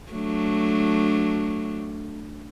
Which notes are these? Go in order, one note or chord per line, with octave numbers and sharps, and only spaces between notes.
F#3 A3 D4